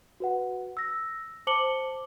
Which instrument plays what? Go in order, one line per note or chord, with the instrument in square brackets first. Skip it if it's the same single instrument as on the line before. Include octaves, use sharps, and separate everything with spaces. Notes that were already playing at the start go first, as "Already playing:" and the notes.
[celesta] F#4 B4 F#5
E6 A#6
C5 A5 D6 C#7 F#7 G7